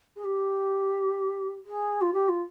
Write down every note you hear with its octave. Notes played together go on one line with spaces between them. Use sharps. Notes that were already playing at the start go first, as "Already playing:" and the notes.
G#4
G4
G#4
F4
G4
F4